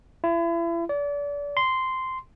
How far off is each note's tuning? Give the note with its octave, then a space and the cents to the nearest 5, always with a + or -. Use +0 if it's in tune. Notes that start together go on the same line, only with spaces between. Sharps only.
E4 +35
D5 -35
C6 -10